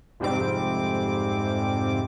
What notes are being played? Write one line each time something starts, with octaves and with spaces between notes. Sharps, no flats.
F2 G#2 C3 G3 C4 D6